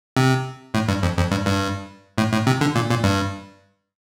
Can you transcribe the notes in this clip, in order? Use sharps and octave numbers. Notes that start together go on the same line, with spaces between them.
C3
A2
G2
F2
F2
G2
G2
A2
A2
C3
D3
A#2
A#2
G2